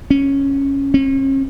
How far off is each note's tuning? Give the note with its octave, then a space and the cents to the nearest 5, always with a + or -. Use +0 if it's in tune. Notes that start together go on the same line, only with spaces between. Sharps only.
C#4 -5
C#4 -40